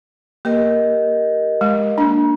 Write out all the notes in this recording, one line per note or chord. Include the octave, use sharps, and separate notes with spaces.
A#3 G4 A#4 D#5
G#3
A#3 D4